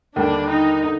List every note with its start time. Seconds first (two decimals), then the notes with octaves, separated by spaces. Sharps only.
0.16 D#2 D3 G3 D4
0.50 D#4
0.84 D3